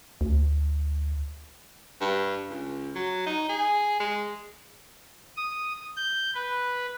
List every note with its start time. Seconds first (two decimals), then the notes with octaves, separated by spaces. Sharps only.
0.21 D2
2.01 G2
2.49 C#2
2.95 F#3
3.26 D#4
3.49 G#4
4.00 G#3
5.37 D#6
5.96 G6
6.34 B4